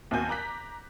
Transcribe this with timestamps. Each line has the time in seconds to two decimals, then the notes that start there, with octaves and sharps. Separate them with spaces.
0.11 D#2 C4 F#4 G#5 G6
0.29 A#5 D6 F#6 B6